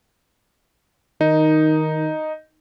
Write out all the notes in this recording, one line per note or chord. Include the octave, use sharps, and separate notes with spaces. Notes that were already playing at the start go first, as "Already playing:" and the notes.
D#3 D#4